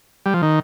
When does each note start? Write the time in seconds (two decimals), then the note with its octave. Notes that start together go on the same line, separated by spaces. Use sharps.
0.26 G3
0.34 F3
0.42 D#3